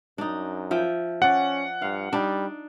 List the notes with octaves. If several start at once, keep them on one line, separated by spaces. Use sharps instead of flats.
F#2 D4 D#4
F3 E5 G5
C#4 D5 F#5
G2 F5
G3 D4 D#4